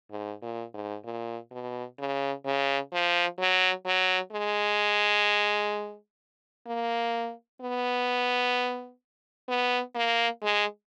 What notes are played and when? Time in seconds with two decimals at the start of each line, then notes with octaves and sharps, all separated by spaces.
0.11 G#2
0.42 A#2
0.74 G#2
1.05 A#2
1.51 B2
1.99 C#3
2.45 C#3
2.93 F3
3.39 F#3
3.86 F#3
4.32 G#3
6.67 A#3
7.61 B3
9.49 B3
9.95 A#3
10.42 G#3